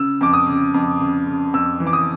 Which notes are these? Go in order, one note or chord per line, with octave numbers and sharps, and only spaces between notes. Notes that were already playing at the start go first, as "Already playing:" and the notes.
Already playing: C#3 E6
F2 D6
D#6
C#3
F2
C#3
C#3
F2 E6
E3
D6
D#6